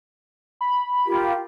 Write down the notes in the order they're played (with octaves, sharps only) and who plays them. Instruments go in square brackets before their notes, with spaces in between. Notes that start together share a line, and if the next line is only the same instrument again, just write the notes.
[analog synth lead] B5
[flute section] F4 G4 A#4